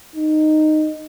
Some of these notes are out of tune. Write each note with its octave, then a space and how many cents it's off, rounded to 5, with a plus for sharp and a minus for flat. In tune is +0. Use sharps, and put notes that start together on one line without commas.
D#4 -10